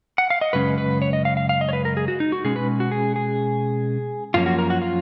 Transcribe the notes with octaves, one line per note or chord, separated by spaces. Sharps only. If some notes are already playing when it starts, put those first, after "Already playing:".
F#5
F5
D#5
F#2 C#3 G#3 C#4 B4
B4
C#5
D#5
F5
F5
F5
D#5
C#5
B4
A#4
G#4
F#4
D#4
F#4
B2 G#3 C#4 G#4
B4
F#4
G#4
G#4
F#2 F3 A#3 C#4 F4
F#4
A#4
F#4
F4